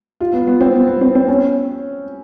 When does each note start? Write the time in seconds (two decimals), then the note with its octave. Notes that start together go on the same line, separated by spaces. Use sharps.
0.21 F4
0.33 B3
0.47 B3
0.61 C4
0.74 B3
0.87 B3
1.01 C4
1.15 C4
1.28 C#4